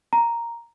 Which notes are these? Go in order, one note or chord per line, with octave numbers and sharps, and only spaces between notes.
A#5